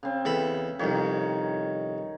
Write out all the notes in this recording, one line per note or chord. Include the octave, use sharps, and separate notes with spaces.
C#3 C4
E2 A4 B5
C2 F2 D#3 C#5